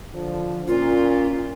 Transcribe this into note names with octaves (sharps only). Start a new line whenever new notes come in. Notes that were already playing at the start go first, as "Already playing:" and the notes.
D3 F3
A#2 C#4 F4